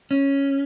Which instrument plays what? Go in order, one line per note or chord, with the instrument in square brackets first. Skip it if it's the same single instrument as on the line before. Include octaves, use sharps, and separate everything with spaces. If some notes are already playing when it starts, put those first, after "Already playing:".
[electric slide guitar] C#4